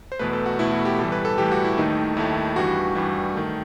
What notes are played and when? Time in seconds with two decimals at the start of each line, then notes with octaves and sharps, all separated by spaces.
0.12 C5
0.19 E2 B2 A3 B4
0.33 A4
0.46 F#4
0.59 E2 B2 A3 E4
0.72 F#4
0.85 G4
0.99 A2 E3 G3 A4
1.12 B4
1.25 A4
1.38 A2 E3 G3 G4
1.51 F#4
1.64 E4
1.77 D#2 D#3 A3 D#4
2.17 D#2 D#3 A3 E4
2.56 G2 E3 G3 F#4
2.95 G2 E3 G3
3.35 D#3 A3